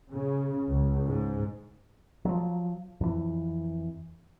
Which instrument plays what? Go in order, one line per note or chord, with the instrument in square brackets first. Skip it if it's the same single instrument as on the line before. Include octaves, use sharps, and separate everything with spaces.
[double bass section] C#3
C#2
G#2
[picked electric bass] F3 F#3
F2 E3